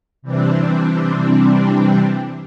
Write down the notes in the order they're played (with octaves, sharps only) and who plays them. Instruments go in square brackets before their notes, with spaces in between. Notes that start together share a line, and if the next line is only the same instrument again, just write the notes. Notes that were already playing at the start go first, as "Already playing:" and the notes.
[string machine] C3 E3 G3 C4 D4